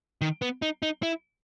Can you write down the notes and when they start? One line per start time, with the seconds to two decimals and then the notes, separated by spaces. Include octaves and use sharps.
0.21 D#3
0.42 B3
0.62 D#4
0.83 D#4
1.03 E4